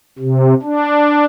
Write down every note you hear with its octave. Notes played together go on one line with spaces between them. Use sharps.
C3
D4